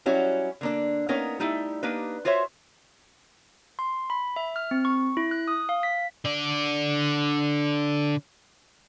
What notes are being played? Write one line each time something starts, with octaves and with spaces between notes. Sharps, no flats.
F#3 G3 C#4 E4 F#4
D3 A#3 D4
A#3 B3 C#4 D#4 A#4
G3 A3 D#4 E4
A#3 D4 D#4 G4 B4
F4 F#4 C5 C#5 E5
C6
B5
E5
F6
C4
C#6
E4
F#6
D#6
F5
B6
D3 D5